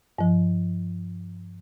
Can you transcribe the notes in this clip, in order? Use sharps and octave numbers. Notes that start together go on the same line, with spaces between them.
G2 F3